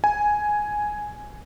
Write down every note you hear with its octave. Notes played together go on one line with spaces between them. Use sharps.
G#5